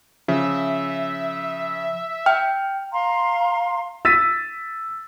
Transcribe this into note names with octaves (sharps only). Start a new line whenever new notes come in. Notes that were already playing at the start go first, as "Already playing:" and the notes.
C#3 F3 E5
G5 F6
F5 A#5 C6
E6 A6 B6 D#7